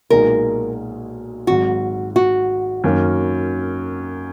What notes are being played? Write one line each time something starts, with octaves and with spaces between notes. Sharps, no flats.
B1 A#2 G#3 D#4 G#4 A#4
G#1 G#2 F#3 F#4
F#4
F#2 D#3 A#3 C#4